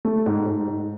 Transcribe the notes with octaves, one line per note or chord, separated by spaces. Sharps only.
A3
G#2
G#2
G#2